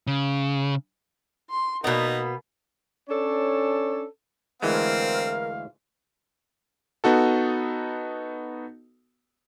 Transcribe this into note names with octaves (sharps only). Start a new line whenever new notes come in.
C#3
C6
B2 A#3 B3 D#4
C#4 D4 A4 C#5
D2 E3 G#3 C4 A#4 F5
B3 D#4 F#4 A4